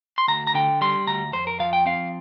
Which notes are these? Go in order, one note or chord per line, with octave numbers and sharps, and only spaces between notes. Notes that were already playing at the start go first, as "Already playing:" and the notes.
C6
D2 A#5
A#5
D3 G5
G3 C6
D2 A#5
F2 C5
A#4
F3 F5
G5
C4 F5